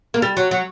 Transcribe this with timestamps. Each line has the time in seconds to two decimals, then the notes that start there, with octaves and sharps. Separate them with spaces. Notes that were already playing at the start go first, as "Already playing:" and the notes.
0.14 A#3
0.22 G3
0.37 F#3
0.51 F#3